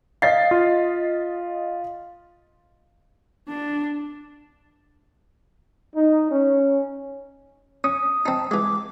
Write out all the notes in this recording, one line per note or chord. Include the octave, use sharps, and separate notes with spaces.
D#5 F5 A6 C7
F4
D4
D#4
C#4
C#4 D#6
C4 D#4 A5
E3 G#3 D6